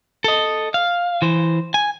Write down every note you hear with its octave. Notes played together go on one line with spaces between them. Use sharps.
A4 D#5
F5
E3 C5
G#5